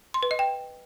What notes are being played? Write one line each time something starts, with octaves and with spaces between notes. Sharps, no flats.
C6
B4
D#5
G5